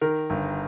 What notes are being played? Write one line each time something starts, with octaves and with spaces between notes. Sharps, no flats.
D#3 A#4
G1